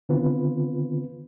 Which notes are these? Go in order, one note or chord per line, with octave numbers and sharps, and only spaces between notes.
D3 D#3 B3 C4 F4 B4